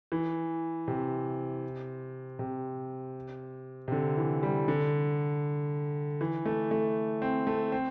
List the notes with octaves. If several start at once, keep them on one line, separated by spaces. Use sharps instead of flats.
E3
C3
C3
C3
D3
E3
G3
D3
E3
A3
A3
C4
A3
C4